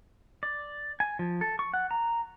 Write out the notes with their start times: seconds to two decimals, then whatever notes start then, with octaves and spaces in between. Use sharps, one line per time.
0.43 D5
1.00 G#5
1.19 F3
1.41 A4
1.59 C#6
1.74 F#5
1.91 A#5